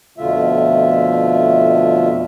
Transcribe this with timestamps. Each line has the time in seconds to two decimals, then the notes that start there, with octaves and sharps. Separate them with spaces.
0.18 F2 B2 D3 A3 F4 E5